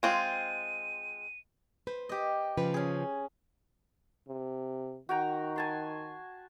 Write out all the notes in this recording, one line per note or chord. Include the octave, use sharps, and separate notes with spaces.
G#3 C4 F4 D#7
B4 C5
G4 D#5
C#3 F3 B4
C#4 G#4
C3
D#3 F#4 G5 A#5
G#5 A5 C6